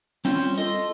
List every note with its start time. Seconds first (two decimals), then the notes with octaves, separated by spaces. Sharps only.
0.25 G3 C4 C#4 F4
0.58 F4 A4 D#5